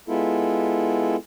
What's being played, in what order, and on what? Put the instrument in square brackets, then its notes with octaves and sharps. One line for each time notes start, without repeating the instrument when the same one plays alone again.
[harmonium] G#3 B3 E4 F4 A4